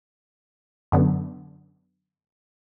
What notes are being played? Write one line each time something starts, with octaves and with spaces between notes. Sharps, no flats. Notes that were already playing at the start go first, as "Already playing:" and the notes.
F#2 D3 B3